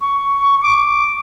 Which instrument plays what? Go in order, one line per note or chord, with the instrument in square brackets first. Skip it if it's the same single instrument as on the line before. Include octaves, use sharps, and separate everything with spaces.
[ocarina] C#6
[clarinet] D6